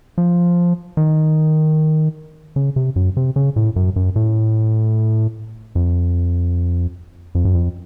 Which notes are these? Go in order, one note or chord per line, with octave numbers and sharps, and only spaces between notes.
F3
D#3
C#3
C3
F#2
C3
C#3
A2
F#2
F#2
A2
F2
F2
F#2
F2